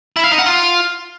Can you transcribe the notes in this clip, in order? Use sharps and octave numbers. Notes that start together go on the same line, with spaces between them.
E4
F5
D#4
F#5
F4